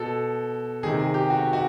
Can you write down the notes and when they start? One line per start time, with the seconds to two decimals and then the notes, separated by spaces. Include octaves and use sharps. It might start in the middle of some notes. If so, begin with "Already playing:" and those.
Already playing: B2 A4
0.83 D#3 G#4
0.87 C3
0.99 G#4
1.14 G4
1.30 F#4
1.53 F#4